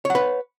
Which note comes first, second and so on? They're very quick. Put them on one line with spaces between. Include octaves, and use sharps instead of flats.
C#5 F#5 B4